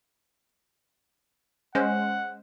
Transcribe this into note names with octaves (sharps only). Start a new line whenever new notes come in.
G#3 C#4 C5 F#5